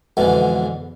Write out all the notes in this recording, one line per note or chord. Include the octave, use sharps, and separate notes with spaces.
F2 G#2 B2 D3 E3